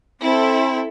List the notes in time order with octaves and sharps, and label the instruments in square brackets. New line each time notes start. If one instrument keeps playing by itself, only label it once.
[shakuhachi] C4 [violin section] E4 A4